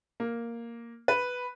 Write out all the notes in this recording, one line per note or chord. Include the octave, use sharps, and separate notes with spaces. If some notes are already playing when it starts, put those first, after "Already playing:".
A#3
B4